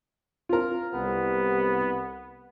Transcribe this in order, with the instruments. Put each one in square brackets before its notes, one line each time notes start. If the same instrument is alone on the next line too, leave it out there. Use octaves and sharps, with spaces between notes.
[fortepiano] F4 A#4
[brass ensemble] C2 [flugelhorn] B3